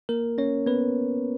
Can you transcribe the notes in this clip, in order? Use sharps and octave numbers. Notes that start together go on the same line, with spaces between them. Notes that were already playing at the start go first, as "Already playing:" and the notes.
A#3 A#4
C#4 C#5
B3 B4